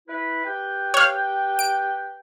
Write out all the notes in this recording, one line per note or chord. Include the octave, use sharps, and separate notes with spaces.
E4 B4
G4 B4 G5
C#5 F5
D7